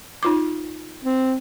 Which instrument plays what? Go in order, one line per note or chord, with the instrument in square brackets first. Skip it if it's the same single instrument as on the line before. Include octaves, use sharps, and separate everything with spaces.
[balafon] D#4 F4 D6
[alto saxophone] C4